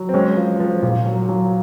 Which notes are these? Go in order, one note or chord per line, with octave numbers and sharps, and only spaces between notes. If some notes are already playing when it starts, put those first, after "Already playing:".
Already playing: F#3
C4
G#3 C#4
F3
F3
A#2
F#3
F#3